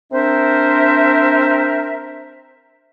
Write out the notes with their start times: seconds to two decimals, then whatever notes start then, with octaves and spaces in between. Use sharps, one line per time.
0.13 C4 D4 A#4 C5 E5